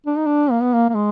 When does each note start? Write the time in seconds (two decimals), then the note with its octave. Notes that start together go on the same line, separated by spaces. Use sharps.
0.06 D4
0.16 D#4
0.26 D4
0.51 A#3
0.62 B3
0.73 A#3
0.89 A#3
0.95 G#3